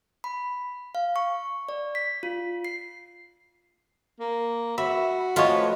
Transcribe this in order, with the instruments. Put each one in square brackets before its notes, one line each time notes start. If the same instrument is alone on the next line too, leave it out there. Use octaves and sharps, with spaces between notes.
[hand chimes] B5
F5
C#6
D5
B6
F4
C7
[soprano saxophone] A#3
[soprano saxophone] F#4 [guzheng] E5 [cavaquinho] B5
[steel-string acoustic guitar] F3 G#3 A3 [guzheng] F4 [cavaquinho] B4 C#5